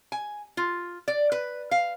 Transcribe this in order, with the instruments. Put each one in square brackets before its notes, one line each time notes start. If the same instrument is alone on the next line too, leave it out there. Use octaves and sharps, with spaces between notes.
[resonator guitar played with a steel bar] G#5
F4
D5
B4
F5